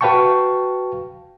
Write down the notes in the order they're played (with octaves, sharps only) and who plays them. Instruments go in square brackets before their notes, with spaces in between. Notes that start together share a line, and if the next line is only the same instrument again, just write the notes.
[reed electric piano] F#4 B4 F5 G5 A5 C#6